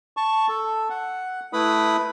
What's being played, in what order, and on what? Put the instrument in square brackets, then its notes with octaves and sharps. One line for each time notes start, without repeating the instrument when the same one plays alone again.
[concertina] A5 C#6
A4
F#5
A3 E4 B4 B5 D#6